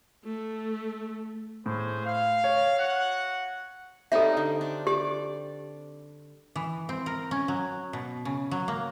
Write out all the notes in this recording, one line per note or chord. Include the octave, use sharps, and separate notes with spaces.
A3
A2 G#4 C5
F5
C#5
F#4 F#5
G3 C4 D#4 A4 E5
D3
D4
G4 D5
E3
C4
A#4
C#4
F#3
B2
C#3
F#3
A#3